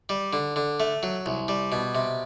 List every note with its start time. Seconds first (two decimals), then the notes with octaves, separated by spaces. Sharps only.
0.09 G3
0.33 D3
0.56 D3
0.80 A3
1.03 F#3
1.26 C2
1.48 G3
1.72 B2
1.95 C3